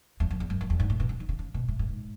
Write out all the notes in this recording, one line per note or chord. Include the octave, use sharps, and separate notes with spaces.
E2
F#2
E2
F#2
F#2
E2
G#2
A2
B2
C#3
D#3
C#3
C#3
B2
A2
A2
G#2